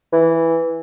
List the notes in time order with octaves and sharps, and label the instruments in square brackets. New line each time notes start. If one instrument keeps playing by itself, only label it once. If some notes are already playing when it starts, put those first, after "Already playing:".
[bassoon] E3